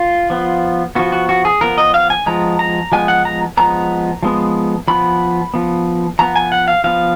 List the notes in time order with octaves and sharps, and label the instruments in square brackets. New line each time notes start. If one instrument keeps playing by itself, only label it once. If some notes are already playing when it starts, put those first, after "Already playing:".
Already playing: [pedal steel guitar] F4
F3 B3
F3 B3 F#4
F#4
F#4
G#4
F3 B3 A#4
D#5
F5
G#5
F3 G#3 B3 A#5
A#5
F3 G#3 B3 G#5
F#5
A#5
F3 G#3 B3 A#5
F3 G#3 B3
F3 B3 B5
F3 B3
F3 B3 A#5
G#5
F#5
F5
F3 B3 F5